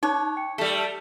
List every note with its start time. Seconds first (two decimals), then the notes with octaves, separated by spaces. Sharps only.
0.03 D#4 C#5 A5 D6 F#6
0.37 G5 C#7
0.58 G3 A3 A4 B6 C#7